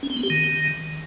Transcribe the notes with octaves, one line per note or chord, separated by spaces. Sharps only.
C#4
C4
B3
G4
D#3